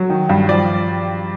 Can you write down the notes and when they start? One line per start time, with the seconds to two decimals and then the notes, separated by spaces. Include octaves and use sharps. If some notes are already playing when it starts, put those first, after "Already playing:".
Already playing: F#3
0.10 D#3
0.29 G2
0.49 F3 D5